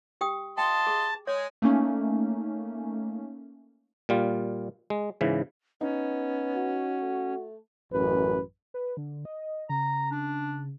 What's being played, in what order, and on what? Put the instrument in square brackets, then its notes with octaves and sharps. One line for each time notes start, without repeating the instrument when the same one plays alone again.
[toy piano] G4 G5 D#6
[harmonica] F4 D#5 C6 [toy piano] G5 [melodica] A5
[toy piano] G#4
[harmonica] G#3 G#4 [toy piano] C#5
[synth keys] A3 A#3 C#4 D#4
[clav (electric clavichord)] A#2 G3 F4
G#3
G#2 C#3 E3
[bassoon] B3 [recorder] C#4 [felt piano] D#4
[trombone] F#4
[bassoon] A3
[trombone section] A1 F#2 B4
[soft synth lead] B4
D3
D#5
[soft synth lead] C#3 [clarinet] A#5
[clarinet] D4